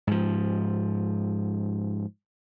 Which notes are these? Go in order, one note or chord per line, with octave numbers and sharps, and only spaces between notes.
G#2 F3